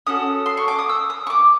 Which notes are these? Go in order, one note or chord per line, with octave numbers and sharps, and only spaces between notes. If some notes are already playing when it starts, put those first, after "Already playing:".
C#4 F#4 A4 D#6
C6
C#6
D6
D#6
E6
D#6
C#6
D6